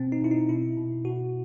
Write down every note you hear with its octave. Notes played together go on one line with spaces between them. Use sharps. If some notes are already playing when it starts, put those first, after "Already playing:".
Already playing: B2 C4
D#4
B2 E4
D#4
B2 E4
B2
B2 F#4